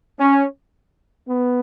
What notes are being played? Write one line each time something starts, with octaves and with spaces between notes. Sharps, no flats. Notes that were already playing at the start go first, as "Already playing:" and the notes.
C#4
B3